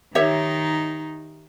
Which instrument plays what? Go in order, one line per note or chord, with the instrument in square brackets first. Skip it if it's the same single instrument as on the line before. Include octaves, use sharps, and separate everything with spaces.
[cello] D#3 D#4 [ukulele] G4 C#5 E5